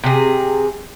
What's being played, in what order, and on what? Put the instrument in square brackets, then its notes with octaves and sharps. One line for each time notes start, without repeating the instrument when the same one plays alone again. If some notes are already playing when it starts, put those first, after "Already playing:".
[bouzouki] C3 G#4